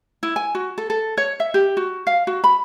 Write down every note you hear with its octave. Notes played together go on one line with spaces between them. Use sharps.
E4
G#5
F#4
A4
A4
C#5
E5
G4
F#4
F5
F#4
B5